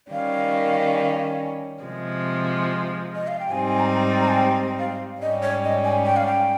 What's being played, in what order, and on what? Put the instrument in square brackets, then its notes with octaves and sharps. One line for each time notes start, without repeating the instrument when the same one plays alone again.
[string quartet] D#3 G3 C#4 [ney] F5
[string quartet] C3 F3 G#3
[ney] D#5
F5
G5
[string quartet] G#2 G3 C4 D#4 [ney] G#5
[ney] G#5
A#5
A#5
G#5
G5
F5
[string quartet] G#2 G3 C#4 [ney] D#5
[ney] C#5
D#5
G#5
G5
F5
G5